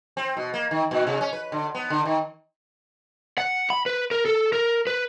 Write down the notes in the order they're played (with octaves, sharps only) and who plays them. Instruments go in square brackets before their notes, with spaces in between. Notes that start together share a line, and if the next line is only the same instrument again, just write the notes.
[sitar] C4
B2
A#3
D#3
A#2
C3
C#4
B4
D3
B3
D3
D#3
[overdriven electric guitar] F#5
B5
B4
A#4
A4
A#4
B4